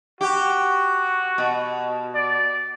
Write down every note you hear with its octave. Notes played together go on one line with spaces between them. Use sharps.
F#4 G4
B2
D5